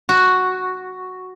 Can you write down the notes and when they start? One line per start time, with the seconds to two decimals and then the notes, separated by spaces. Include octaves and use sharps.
0.09 F#4